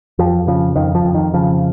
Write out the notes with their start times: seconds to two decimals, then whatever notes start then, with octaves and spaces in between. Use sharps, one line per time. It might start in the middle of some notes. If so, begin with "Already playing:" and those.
0.19 F2 F3
0.47 C#3 F3
0.76 F2 D#3
0.95 F3
1.05 F2
1.14 D#3
1.34 C#3 F3